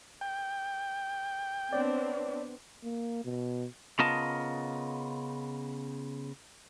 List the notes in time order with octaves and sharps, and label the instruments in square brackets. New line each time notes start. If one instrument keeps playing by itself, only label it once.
[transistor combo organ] G5
[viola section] B3 C4 D4 [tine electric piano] C#5 D5
[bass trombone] A#3
B2
[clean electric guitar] C#3 B3 F4 A#4 D#5 A5